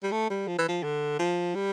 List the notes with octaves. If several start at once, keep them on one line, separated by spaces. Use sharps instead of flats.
G3
A3
G3
F3
E3
F3
D3
F3
G3